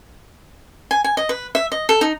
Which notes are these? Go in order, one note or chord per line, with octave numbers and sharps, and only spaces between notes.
G#5
G#5
D#5
B4
E5
D#5
A4
D#4